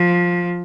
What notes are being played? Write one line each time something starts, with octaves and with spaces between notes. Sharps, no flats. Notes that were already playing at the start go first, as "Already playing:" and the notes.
Already playing: F3